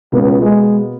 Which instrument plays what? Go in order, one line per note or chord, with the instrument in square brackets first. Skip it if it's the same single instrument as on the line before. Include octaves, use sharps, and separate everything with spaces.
[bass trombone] C#2 [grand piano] B2 A#3 B3
[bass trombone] G#3